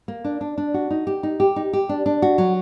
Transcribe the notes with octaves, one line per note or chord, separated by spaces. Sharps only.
A#3
D4
D4
D4
F#4
D#4
G4
D#4
G4
D#4
G4
D4
D4
F#4
F#3